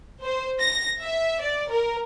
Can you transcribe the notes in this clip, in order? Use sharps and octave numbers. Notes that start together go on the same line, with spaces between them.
C5
A#6
E5
D5
A#4